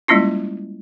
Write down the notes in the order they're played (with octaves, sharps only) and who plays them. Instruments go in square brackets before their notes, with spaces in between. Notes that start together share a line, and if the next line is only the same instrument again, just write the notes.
[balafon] G3 G#3 A#3 C#4 E4 F4